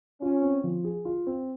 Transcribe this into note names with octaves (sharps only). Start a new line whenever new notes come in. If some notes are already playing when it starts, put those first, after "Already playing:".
C#4 F4
C4
F3
G#4
F4
C4